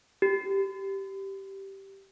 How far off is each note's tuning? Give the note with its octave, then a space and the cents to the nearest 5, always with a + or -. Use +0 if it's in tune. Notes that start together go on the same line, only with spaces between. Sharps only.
G4 -10